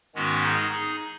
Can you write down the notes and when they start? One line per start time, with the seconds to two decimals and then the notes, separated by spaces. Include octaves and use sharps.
0.15 G#2 D#3 G#3 B3 C#4 F#4
0.43 D#4 G#4
0.71 D#4 G#4